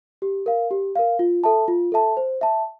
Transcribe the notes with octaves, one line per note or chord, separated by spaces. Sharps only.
G4
A#4 F5
G4
A#4 F5
F4
A4 E5 A5
F4
A4 E5 A5
C5
E5 A5